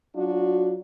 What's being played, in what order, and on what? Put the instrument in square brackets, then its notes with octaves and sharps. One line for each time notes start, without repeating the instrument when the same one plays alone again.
[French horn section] F#3 D4 F4 F#4